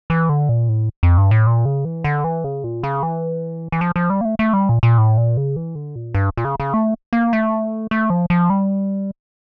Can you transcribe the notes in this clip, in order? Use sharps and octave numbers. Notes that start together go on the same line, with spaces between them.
E3
D3
A#2
A2
F2
G2
A2
A#2
C#3
E3
D3
E3
C#3
A#2
C#3
E3
E3
F3
F3
G3
A#3
A3
A3
G3
A#2
A#2
A2
A#2
C#3
E3
D3
A#2
G2
A#2
C#3
C#3
A3
A#3
A3
A3
F3
F3
G3